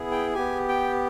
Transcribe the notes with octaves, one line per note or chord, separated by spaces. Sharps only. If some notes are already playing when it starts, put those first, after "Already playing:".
Already playing: B3 E4 G#4
G5
B3 G4 G#5
G5